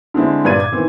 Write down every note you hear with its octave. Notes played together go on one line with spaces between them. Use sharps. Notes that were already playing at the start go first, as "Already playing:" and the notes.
D3 G#3 C4 E4
G2 A#2 B4 D5 G#6 D#7
D6 G#6
D#3 E3 C4